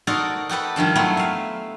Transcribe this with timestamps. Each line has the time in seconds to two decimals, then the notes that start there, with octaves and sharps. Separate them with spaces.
0.07 D#4 F#4 A4 A#4 C5 D5
0.49 F#4 G4 A4 B4
0.76 G2 D#3 F3 D4
0.95 F#3 A3 B3 C4 E4
1.17 E5 F5